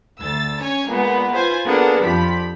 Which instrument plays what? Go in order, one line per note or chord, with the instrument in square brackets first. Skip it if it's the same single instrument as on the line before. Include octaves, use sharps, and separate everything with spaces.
[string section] D2 E6 A6
C#4 C#5 G#5
A#2 G#3 B3
F4 B4 C5 G#5
A#3 B3 D4 G#4 A4 F#5
F2 F3 G4 B5 B6